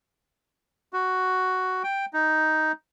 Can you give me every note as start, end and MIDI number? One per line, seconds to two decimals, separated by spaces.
0.93 1.83 66
1.84 2.05 79
2.13 2.72 63